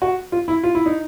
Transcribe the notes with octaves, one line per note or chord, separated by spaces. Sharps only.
F#4
F4
E4
F4
E4
D#4